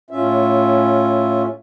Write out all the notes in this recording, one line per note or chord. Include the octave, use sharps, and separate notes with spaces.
A2 C#4 F4 E5